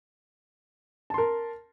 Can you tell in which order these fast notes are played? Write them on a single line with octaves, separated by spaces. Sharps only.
A5 C6 A#4